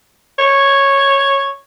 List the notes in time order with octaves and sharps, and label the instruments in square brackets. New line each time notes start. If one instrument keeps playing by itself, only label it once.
[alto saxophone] C#5